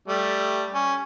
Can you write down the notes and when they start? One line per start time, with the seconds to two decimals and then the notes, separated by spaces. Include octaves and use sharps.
0.08 G3 A3
0.74 C#4